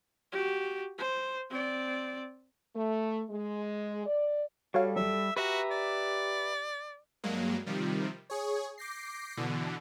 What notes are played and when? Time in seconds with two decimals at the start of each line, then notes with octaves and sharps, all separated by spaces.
0.32 F#4 G4
0.98 C5
1.50 C4 D5
2.75 A3
3.30 G#3
4.06 D5
4.74 G3 F#4 A4 C#5 F5
4.96 A1 F#3 E5
5.37 F#4 G4 B4 E5 A#5
5.71 D5
7.24 G2 F#3 G#3 A#3
7.66 C3 D#3 F3 G3
8.30 G#4 C#5
8.78 D6 G6 A#6 C7
9.37 B2 D3 E3